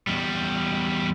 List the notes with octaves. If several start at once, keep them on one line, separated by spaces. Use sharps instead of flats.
E2 G3